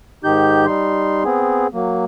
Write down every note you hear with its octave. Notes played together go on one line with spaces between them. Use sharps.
G#2 D#3 D#4 G4 G6
G3 D#4 C6
B3 C4 G#4
F#3 A#3